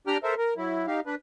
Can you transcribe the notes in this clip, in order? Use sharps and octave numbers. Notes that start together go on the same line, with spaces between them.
D4 G4 G5 A#5 F6
A4 A#4 C5 E5
A#4
F#3 E4
D#4 G4 F5
D4 B4